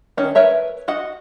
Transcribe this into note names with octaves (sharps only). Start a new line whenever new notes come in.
D#3 C#4 D#4
A#4 B4 C#5 E5 A#5
F#4 D#5 F#5